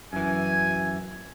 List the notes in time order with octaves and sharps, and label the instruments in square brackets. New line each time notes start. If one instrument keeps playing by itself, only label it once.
[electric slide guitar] F#2 E3 [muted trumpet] G#5